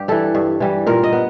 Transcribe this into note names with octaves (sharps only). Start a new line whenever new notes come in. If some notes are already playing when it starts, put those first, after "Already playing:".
Already playing: G2 G4
E3 G3 A4
G2
E3 G3
A#2 A#4
D#5
B3